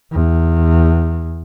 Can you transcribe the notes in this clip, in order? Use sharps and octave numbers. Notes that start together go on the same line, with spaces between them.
E2